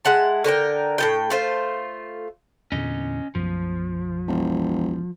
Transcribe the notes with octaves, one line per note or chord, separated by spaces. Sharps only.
G#3 E4 F#5 A5
D3 A#4 C5 G5
A2 B3 G5
A3 F4 C5
E2 A#2 D3 C#4 D#5
B1 F#2 F3
E1